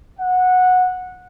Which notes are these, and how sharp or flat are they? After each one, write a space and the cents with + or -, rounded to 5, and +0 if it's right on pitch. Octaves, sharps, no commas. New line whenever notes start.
F#5 -15